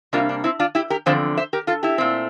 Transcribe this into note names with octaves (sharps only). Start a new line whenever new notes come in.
C3 G3 A#3 D4 F4
D4
C4 E4
D4 F4
E4 G4
G4 A#4
E2 D3 F3 C4 A4 C5
C5 E5
G4 A#4
F4 A4
E4 G4
A#2 A3 C4